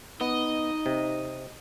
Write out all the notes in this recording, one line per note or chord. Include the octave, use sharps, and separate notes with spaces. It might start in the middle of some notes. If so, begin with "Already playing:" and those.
B3 D#4 D#5
C3